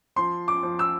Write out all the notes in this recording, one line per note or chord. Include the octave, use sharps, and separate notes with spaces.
F3 C6
D6
F3
E6